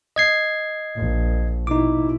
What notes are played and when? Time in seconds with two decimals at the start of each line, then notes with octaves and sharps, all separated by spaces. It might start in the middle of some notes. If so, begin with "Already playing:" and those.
0.16 D#5 G#6 C7
0.96 A#1
1.67 B2 D#4 E4 D6